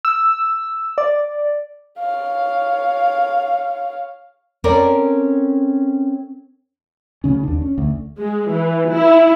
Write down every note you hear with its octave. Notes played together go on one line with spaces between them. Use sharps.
E6
D5
C#5 F5
C4 C#4 A4 A#4 D5
D2 C#3 C#4
D#2 D4
C#4
D2
G#3
E3
E4